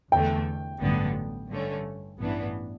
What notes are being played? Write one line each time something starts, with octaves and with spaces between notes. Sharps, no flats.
E2 D3 A3 G5
A1 G2 D3 F#3 B3
G2 D3 A3 C#4
A1 G2 E3 B3 D4